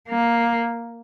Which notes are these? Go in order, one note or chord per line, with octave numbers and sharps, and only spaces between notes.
A#3